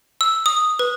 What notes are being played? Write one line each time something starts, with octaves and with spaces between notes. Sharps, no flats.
E6
D#6
B4